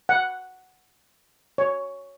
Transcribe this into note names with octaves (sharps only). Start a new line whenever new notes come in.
F#5
C#5